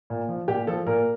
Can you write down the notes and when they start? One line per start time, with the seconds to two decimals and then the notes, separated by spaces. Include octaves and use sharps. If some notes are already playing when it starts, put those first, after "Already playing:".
0.10 A#2
0.29 F3
0.48 A#2 G4
0.67 F3 A4
0.87 A#2 A#4